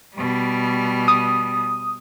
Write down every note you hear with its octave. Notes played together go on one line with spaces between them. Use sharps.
B2 G3
D#6